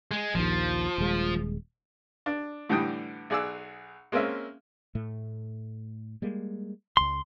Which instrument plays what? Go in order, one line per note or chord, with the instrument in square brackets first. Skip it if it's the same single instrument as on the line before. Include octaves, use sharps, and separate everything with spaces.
[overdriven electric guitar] G#3
[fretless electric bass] A#1 D#2 [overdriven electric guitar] F3
[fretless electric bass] D#1 G#3
[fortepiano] D4
A2 D3 E3 G3 G5 D#6
B1 G#4 D5 F#5 E6
G#3 A#3 C4 C#4 E5
[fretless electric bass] A2 A3
G3 G#3 A#3
[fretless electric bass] D1 C#2 [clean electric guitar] C6